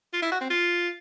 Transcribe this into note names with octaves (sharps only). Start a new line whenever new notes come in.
F4
E4
F#4
C4
F4